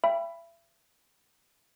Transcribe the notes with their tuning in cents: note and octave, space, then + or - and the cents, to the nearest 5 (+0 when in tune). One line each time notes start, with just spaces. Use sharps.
E5 +35 G5 +0 B5 +0